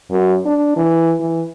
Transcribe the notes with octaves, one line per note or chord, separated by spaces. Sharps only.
F#2
D4
E3
E3